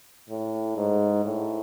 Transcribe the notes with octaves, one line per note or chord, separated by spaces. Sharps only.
A2
G#2
A2